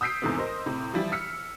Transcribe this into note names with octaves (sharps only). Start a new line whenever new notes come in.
D#6 E6 G6 B6 C7 D7
E2 G#2 C3 E3 A3 B3
A#4 C5 D#5
A2 C3
E3 F3 G3 E4
E6 F6 B6 C#7